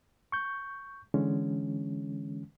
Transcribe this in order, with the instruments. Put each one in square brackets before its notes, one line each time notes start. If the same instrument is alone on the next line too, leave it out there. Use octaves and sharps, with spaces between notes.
[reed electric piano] C#6 G6
D3 E3 G#3 C#4